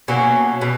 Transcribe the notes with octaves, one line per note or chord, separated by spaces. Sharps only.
B2 F#3 A#3 C#4
B2